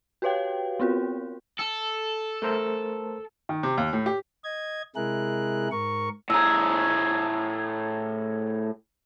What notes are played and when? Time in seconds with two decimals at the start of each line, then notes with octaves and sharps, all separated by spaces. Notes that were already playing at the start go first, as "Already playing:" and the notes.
0.22 F#4 G4 B4 C#5 F5 G5
0.80 B3 C4 F4 F#4 A#4
1.59 A4
2.42 A3 A#4 C5
3.49 D#3
3.63 C3
3.78 D#2
3.93 A2
4.06 G4
4.44 D#5 G#6
4.96 C3 G#3 E4 G#4 A#4 F#6
5.71 G#2 A#4 C#6
6.30 A2 G#4 A#5 E6